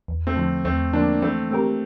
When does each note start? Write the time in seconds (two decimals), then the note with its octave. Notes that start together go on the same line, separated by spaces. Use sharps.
0.08 E2
0.27 A3 C4
0.36 D3 F3
0.65 E2 A3 C4
0.93 D3 F3 A#3 D4
1.22 E3 A3 C4
1.51 A3 C4 G4 A#4